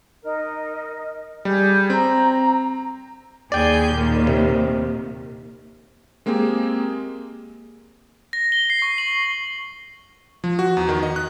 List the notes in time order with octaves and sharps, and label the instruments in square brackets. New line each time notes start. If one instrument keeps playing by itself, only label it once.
[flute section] D#4 A#4 D#5
[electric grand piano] G3 [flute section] G#4 G6
[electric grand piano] C4 [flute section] A#5
[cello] D#2 [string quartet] G#4 G#5 G6 [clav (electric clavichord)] D5 G5
[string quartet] A#2 D#3
[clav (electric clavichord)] C3
[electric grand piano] G#3 A#3 C4 G4 G#4
[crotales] A#6
G7
C7
C#6
F#7
[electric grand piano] F3
F#4
E2
D#3
D#5
F#6